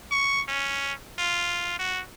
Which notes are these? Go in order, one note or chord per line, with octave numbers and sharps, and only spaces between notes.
C#6
C#4
F4
F#4